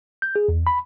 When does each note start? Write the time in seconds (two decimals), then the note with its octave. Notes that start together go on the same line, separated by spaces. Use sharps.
0.22 G6
0.36 G#4
0.48 E2
0.67 B5